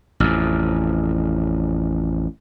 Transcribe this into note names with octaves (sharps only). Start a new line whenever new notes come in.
A1 F2